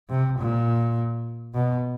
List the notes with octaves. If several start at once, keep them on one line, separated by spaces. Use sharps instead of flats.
C3
A#2
B2